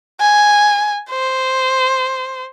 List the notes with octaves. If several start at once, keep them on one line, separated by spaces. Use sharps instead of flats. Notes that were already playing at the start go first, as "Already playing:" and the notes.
G#5
C5